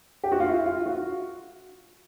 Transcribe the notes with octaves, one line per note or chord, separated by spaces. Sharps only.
G4
F#4
F4
E4
F4
F#4